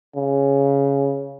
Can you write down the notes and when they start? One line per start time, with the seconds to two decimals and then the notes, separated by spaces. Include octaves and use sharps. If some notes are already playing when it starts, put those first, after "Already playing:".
0.16 C#3